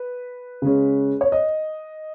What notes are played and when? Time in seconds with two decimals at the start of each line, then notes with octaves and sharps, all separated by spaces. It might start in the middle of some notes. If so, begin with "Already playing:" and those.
Already playing: B4
0.62 C#3 G#3 C#4
1.21 C#5
1.32 D#5